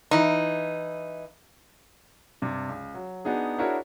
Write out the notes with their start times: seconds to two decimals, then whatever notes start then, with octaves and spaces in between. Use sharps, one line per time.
0.11 E3 D#4
2.42 G2 C3
2.69 C#2
2.94 F#3
3.25 B3 D4 D#4 F#4 G#4
3.58 D4 E4 F#4 G#4 A#4 C#5